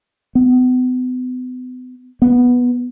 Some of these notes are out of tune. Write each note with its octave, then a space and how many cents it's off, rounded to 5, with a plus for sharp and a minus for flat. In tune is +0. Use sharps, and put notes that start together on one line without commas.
B3 +40
B3 -5